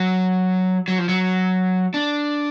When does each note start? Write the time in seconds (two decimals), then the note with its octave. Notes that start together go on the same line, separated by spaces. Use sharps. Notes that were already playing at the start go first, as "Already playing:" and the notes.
Already playing: F#3
0.88 F#3
0.98 F3
1.09 F#3
1.94 D4